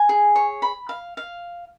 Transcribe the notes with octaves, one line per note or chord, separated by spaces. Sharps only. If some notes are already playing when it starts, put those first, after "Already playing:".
Already playing: G#5
G#4
C#5
B5
F5
F5